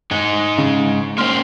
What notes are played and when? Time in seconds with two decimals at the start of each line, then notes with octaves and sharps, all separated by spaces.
0.11 G#2 G#3 D#4
0.58 C#3
1.18 A#3 C#4 C5 C6 F6